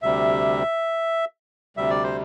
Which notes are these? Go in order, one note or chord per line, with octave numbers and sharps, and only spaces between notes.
D2 C3 G3 E5
D2 C3 G3 E5
D5
C5